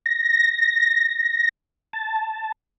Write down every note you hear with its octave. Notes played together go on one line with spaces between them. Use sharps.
A#6
A5